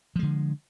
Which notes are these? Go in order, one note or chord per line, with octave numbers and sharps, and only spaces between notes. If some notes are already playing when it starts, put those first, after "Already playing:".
D3 F3 G#3